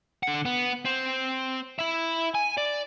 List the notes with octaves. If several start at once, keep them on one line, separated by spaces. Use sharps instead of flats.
D3 F#5
B3
C4
E4 E5
G#5
D5